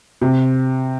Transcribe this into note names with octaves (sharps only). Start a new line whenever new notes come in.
C3